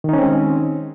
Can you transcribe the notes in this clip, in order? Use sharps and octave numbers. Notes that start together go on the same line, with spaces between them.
D#3 G#3 C4 C#4 D#4